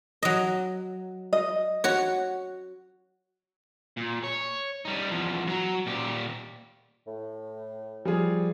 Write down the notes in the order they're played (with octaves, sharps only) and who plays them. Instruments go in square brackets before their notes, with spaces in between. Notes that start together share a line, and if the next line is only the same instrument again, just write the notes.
[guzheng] F#3 D#5
[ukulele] D#5
[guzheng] F#4 C#5
[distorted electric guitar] A#2
C#5
G3 D#4
E2 F3
F#3 A#5
A#2 G4
[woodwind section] A2
[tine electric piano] F3 [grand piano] G3 F4 G#4